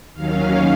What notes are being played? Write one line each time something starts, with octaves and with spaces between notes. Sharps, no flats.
D#2 D#3 F#3 C#4 F5